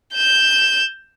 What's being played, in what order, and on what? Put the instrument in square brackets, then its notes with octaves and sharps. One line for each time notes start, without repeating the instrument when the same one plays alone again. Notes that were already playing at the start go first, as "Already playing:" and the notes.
[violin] G6 E7